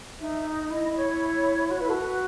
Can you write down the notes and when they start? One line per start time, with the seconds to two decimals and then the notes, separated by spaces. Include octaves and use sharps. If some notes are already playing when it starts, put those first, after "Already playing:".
0.21 D#4 E5
0.45 D#5
0.70 E4 D#5
0.96 C#5
1.70 F#4 C#5
1.79 E4 B4
1.87 F#4 A4
1.96 B4